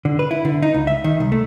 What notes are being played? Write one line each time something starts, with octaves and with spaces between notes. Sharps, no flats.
D3
B4
E4
D3
D#4
C#2
E5
D#3
C2
A3